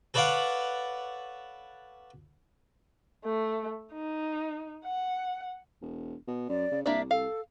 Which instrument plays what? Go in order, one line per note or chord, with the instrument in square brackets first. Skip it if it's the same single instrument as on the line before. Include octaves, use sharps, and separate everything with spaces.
[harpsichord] A4 B4 C#5 D5 F5 F#5
[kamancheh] A3
D#4
F#5
[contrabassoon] E1
B2
[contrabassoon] F#2 [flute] D5
[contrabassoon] C#3
[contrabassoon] C2 [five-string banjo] A#3 D4 D5 [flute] E5
[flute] A4 [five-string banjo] F5